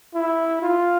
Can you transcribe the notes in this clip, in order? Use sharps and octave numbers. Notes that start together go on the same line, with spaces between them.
E4
F4